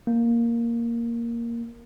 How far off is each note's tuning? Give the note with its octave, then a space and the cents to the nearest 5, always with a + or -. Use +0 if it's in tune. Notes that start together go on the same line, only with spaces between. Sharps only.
A#3 +0